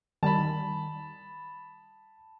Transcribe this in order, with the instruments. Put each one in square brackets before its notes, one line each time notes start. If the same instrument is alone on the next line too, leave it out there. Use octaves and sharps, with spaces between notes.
[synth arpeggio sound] D#3 G3 [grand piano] A5 B5